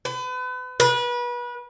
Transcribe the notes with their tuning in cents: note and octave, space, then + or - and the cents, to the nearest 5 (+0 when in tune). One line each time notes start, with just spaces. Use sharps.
B4 +35
B4 -30